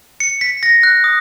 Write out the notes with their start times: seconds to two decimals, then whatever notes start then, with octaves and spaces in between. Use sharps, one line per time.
0.20 C#7
0.41 B6
0.63 A#6
0.83 F#6
1.04 D#6